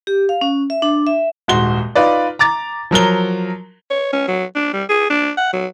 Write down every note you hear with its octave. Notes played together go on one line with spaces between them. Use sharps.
G4
F5
C#4
E5
D4
E5
D#1 G#2 F#4 C6 G7
D#4 F4 B4 D5
A#5 D6 A6
F3 F#3 A#4 G7
C#5
C#4
F#3
D4
G3
G#4
D4
F#5
F#3